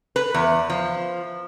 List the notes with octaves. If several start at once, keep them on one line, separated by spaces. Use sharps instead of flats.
B4
E2
F3